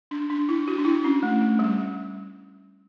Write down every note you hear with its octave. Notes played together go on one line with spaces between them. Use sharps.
D4
D4
E4
F#4
D4
E4
C#4
A3
A3
G3